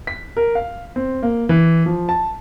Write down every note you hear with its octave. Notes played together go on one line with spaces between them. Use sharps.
B6
A#4
F5
C4
A#3
E3
F3
A5